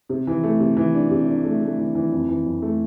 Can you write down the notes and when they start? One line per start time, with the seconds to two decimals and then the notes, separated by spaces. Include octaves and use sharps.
0.09 C3
0.27 E3
0.44 A3
0.60 C3
0.77 E3
0.94 D4
1.11 C3
1.28 D4
1.44 A3
1.61 A3
1.78 E3
1.95 E3
2.12 F2
2.29 E3
2.45 F2
2.62 A3